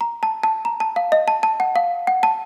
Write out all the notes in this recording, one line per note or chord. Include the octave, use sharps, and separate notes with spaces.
A#5
A5
A5
A#5
A5
F5
D#5
A5
A5
F#5
F5
F#5
A5